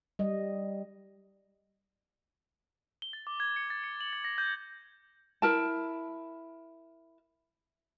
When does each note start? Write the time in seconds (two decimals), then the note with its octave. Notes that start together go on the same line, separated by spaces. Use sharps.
0.19 G3 D#5
3.02 G7
3.13 A6
3.27 D6
3.40 G#6
3.56 C#7
3.70 A6
3.84 C#7
4.00 F#7
4.13 A6
4.24 A#6
4.38 G6
5.42 E4 A#4 A5